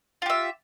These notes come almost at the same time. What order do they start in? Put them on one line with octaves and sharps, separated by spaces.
F4 G4 E5